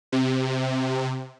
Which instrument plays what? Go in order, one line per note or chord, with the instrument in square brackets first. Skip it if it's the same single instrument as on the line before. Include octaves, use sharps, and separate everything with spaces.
[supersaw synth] C3